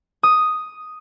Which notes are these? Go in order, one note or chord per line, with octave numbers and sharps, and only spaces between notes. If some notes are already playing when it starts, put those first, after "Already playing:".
D#6